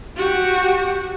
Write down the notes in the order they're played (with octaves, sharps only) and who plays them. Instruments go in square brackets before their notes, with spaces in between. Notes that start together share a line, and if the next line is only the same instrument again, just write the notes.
[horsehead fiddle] F#4 G4